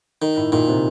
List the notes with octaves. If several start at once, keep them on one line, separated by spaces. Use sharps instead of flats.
D#3
A2
A#2 D#3
C3